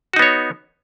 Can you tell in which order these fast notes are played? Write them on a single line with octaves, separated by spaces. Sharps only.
F#4 D#4 B3 C#5